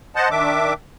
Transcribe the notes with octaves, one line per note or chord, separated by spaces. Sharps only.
C5 D#5 F#5 A5
D#3 D4 E5 D6